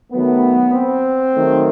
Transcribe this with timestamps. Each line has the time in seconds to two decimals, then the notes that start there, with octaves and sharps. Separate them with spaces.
0.13 D#3 F#3 A3 B3
0.74 C4
1.35 D#3 F#3 A3